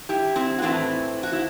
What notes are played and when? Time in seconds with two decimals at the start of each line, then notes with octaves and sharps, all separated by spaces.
0.09 E4 G4
0.35 C4 E4
0.58 F#4
0.62 A2 E3 A3 C4 E4
1.23 F#4
1.33 E4